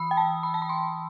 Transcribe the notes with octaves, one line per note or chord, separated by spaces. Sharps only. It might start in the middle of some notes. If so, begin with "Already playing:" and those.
Already playing: E3 B5 D#6 E6
G5
A5
B5
A5
B5
C6